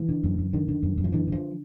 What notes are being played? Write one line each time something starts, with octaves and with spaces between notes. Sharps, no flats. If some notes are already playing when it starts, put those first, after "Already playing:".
Already playing: E3
D3
F#2
F#2
D3 D#3
D3
F#2
F#2
F3
D3 E3
D3 F3